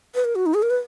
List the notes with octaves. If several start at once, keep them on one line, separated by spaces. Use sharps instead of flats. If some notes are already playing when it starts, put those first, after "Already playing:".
B4
A#4
F#4
D#4
G#4
A#4
B4